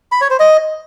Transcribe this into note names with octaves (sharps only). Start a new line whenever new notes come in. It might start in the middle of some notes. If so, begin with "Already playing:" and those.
B5
C#5
C5
D#5